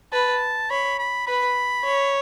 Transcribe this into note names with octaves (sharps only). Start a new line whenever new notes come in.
B4 A5
C#5 B5
B5
B4 B5
C#5